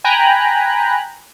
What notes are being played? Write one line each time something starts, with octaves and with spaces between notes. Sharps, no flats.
G5 G#5 A#5 B5 F#6